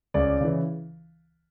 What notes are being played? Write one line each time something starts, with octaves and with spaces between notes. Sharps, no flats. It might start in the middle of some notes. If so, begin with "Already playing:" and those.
C#2 D5
C#3 E3